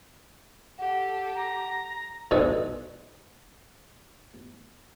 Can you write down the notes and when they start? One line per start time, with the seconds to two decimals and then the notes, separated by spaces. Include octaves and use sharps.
0.79 G4 A4 F#5
1.35 A#5
2.31 G#2 B2 D3 G#4 A4